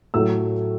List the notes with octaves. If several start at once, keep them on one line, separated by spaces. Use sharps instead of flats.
A2 F#3 A3 E6